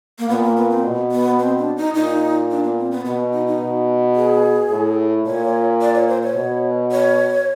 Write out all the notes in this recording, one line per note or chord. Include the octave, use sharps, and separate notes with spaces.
A#3
A#2 B3
A#3
B3
C4
B2
B3
C4
D4
D#4
A#2 D#4
D4
B3
C4
B3
B2 B3
D#4
D#4
B2
G#4
A2
A#2 C#5
D5
C#5
C5
C#5
B2
C#5